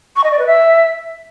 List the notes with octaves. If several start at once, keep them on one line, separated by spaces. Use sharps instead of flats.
C#6
D#5
D5
B4
E5